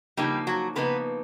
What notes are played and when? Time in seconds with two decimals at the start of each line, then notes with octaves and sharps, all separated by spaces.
0.17 C#3 F3 G3 A#3 D#4 G4
0.47 F#3 F#4
0.75 C#3 F3 A#3 B3 D#4 B4